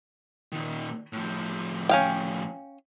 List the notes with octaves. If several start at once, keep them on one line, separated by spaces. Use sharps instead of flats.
A#2 D#3
A2 F3
C#4 F5 G5